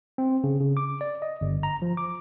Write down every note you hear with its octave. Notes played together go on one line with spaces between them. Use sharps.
C4
C#3
C#3
D6
D5
D#5
G1
A#5
F3
D6